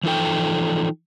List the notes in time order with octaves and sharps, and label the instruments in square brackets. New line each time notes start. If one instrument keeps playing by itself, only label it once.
[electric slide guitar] E3 F3 D#4 A4 G5